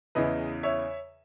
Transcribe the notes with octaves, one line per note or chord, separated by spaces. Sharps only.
E2 C#3 E3 B4 D#5
C#5 E5